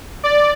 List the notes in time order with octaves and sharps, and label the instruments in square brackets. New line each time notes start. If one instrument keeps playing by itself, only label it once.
[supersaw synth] D5